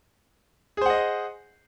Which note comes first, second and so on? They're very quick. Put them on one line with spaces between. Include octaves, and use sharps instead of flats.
G#4 C5 F#5 D#5